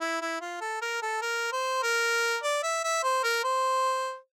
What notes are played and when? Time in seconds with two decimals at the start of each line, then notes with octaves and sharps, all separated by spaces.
0.01 E4
0.21 E4
0.41 F4
0.61 A4
0.81 A#4
1.02 A4
1.22 A#4
1.52 C5
1.83 A#4
2.43 D5
2.63 E5
2.84 E5
3.03 C5
3.24 A#4
3.44 C5